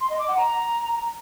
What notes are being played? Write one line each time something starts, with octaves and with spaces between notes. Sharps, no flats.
C6
D#5
D6
F#5
A#5